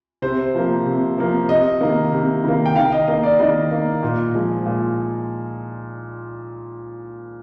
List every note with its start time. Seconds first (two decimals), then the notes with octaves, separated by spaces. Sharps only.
0.22 C3 C5
0.55 F3 A#3
0.86 C3
1.18 F3 A#3
1.49 C3 D#5
1.81 D#3 A#3
2.12 C3
2.44 D#3 A#3
2.66 G5
2.76 D#3 F5
2.92 D#5
3.08 A#3 D#5
3.23 D5
3.39 D#3 D#5
3.71 A#3
4.03 A#2
4.34 F3 G#3
4.66 A#2